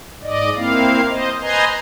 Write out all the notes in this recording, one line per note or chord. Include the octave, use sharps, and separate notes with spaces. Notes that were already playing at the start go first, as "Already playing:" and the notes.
G#2 D5 D#5
A#3 C4 E4 F5
C5 D#5
B4 C5 D#5 G#5 A#5 C6